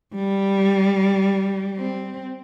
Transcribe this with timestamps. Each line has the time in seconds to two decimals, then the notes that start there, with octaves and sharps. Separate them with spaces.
0.15 G3
1.77 C4